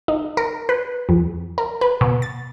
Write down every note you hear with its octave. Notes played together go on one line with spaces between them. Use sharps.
D#4
A#4
B4
F2
A#4
B4
B2
A6